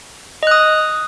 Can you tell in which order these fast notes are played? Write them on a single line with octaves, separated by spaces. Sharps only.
D#5 F#6 D#6